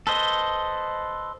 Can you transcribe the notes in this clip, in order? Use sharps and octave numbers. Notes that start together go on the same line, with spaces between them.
A4 B4 C5 D#5